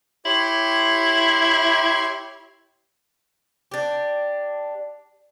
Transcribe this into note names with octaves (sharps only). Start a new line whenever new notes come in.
E4 G4 C#5 C6
D4 G4